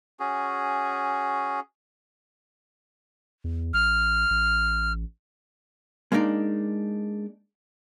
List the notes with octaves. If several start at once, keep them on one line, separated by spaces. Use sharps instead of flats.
C#4 F#4 G#4
E2
A1 F6
A1
G#3 A#3 D4 D#4 D5